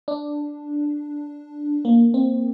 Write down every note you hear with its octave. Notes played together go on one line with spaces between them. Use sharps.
D4
A#3
C4